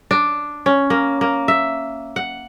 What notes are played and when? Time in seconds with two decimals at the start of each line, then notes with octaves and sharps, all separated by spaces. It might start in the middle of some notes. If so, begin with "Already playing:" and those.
0.11 D4
0.66 C#4
0.90 A#3
1.21 A#3
1.48 E5
2.16 F#5